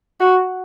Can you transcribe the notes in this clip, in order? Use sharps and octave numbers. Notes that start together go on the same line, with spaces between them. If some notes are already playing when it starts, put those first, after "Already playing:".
F#4